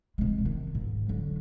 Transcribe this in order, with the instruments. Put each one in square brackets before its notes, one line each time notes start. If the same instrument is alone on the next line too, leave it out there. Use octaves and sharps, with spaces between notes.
[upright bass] C3 G#3
D#3
G#2
D3 F#3